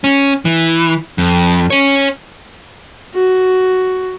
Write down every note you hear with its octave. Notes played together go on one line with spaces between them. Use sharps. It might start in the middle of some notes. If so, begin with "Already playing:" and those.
C#4
E3
F2
C#4 C#5
F#4